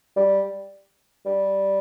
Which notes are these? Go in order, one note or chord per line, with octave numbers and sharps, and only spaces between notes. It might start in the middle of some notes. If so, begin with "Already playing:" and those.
G3
G3